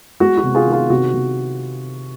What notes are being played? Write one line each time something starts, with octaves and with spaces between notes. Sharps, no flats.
G#3 F#4
F#4
C3
F4 G#4
D#3
F4 G#4
C3 F#4
C3